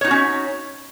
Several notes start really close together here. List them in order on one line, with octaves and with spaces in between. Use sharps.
C#5 D#4 F#4 C#4